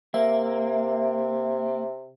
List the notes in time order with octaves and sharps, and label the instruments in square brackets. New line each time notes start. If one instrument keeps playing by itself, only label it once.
[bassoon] C3 [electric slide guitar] A#3 [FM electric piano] E5